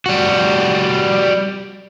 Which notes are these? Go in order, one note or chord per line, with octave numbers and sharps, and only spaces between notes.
G3 F#4